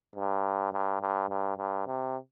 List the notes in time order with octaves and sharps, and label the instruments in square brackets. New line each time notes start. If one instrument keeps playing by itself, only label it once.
[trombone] G2
G2
G2
G2
G2
C3